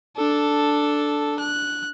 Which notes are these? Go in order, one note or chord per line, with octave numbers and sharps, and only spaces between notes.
D4 A4
F#6